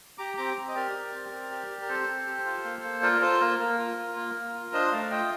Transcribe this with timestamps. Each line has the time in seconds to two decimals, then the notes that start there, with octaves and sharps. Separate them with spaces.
0.18 G4 A#5 D6
0.37 C4 A#5 D6
0.56 C4
0.68 D#5
0.75 G4 A#4 D5
0.95 G4
1.14 C4
1.32 C4
1.51 G4
1.70 G4
1.82 A#4
1.89 C4 A4 C5
2.08 C4
2.27 G4
2.45 F4
2.64 A#3
2.83 A#3
3.02 F4 A#4 D5
3.21 F4 A4 C5
3.41 A#3 A#4
3.59 A#3 A#4
3.78 F4
3.98 F4
4.16 A#3
4.35 A#3
4.54 F4
4.73 D4 C5 D#5
4.92 A3 D5 F5
5.10 F4 D#5 G5